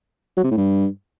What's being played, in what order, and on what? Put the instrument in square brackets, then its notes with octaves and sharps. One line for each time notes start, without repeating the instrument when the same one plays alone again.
[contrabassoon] F#3
C3
A2
G2